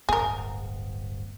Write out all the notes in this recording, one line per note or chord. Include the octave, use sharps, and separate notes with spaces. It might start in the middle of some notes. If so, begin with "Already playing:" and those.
D1 G1 B3 G#4 A#4